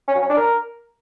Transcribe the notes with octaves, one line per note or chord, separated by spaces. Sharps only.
C#4
F#3
C#4
D4
A#4